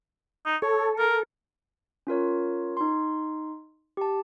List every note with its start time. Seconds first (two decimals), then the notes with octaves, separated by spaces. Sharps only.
0.46 D#4
0.62 A4 C#5
0.98 A#4
2.07 C#4 F4 A#4 C#5
2.77 D#4 C6
3.97 G4 A5